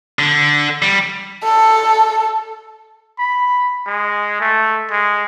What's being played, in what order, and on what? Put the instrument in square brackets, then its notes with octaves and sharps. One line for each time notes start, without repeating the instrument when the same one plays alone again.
[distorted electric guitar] D3
G3
[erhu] A4
[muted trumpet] B5
G#3
A3
G#3